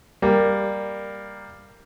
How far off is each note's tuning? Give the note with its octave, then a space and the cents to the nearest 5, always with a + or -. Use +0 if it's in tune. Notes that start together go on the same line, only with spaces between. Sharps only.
G3 +10 A#3 +0